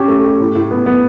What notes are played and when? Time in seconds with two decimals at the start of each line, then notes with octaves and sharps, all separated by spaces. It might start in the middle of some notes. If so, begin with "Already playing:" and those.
Already playing: C#4 G4
0.08 A3
0.24 G4
0.40 A2
0.55 A2
0.71 B3
0.86 B3